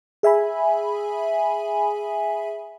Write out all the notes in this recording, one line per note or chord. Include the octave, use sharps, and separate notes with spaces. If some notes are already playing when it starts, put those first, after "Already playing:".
G#4 E5 G#5 B5